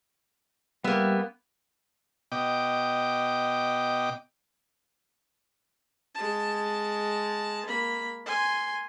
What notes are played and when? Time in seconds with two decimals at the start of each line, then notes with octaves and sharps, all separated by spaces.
0.84 G3 A#3 B3 E5
2.32 B2 D#5 G5 D6
6.15 G#3 A5
7.66 A#3 B5
8.26 G#5 C6